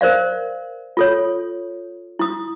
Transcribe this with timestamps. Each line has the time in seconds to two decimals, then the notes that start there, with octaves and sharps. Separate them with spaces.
0.01 A#4 C5 D5 F5
0.97 F4 A4 C#5
2.19 E4 D#6